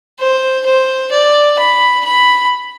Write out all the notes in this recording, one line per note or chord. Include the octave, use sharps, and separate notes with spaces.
C5
C5
D5
B5
B5